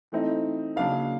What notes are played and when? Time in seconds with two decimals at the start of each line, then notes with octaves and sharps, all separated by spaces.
0.12 E3 A3 C4 D#4
0.76 C#3 F#3 A#3 D4 F5